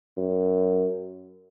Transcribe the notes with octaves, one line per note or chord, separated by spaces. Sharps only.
F#2